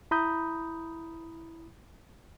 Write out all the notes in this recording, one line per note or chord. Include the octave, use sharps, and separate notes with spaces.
E4 A#5 B5 D#6 G6